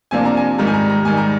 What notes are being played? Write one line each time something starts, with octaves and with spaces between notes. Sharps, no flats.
C3 F3 A#3 D4 G#5
A#5
G#5
G#2 D#3 G3 A#5
G#5
A#5
A#5
G#2 D#3 G3 G#5
A#5